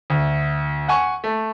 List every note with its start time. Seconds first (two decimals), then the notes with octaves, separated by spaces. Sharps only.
0.10 D2
0.88 F#5 G#5 C#6
1.24 A3